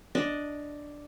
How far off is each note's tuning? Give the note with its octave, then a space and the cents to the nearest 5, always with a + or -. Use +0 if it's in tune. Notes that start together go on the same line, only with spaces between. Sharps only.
D4 +0 D#5 +0